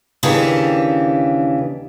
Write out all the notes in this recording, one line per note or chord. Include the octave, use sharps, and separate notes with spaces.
D#2 C#3 E3 D4 G4 A5